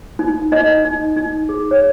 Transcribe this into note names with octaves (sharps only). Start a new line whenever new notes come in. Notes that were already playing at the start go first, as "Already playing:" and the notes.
D#4
D#4 D#5
D#4
D#4
G#4
C#5